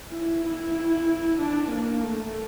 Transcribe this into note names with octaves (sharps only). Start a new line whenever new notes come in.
E4
E4
D4
A#3
A3